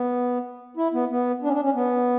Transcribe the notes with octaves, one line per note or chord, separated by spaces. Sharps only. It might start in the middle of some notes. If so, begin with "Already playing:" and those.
Already playing: B3
E4
B3
B3
D4
C#4
D4
C#4
B3